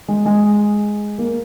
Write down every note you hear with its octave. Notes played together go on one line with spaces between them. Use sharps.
G#3
G#3
A#3